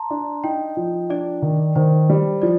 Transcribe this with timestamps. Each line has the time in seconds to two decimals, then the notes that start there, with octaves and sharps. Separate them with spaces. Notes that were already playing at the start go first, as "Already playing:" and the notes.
Already playing: A5 A#5 C6
0.10 D4
0.44 D#4 G5
0.77 F3
1.10 D4 D5
1.42 D#3
1.75 D#3 C5
2.10 G3
2.42 F3 D5